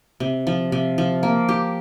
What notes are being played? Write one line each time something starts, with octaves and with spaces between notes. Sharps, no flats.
C3
F3
C3
F3
A#3
G4